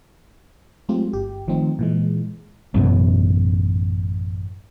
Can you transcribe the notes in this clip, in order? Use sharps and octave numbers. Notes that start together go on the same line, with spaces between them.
F#3 G#3 A3 C4 F4 G4
G1 G4
D#3 F3 A3 C4 D#4
A#2 E3 G#3
A1 F#2 B2